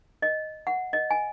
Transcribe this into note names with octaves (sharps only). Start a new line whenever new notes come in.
D#5
F#5
D#5
G#5